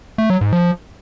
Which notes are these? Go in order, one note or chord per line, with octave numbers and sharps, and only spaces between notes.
A3
F#3
G#2
F3